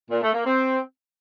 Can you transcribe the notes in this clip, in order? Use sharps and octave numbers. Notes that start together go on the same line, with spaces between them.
A#2
A3
A#3
C4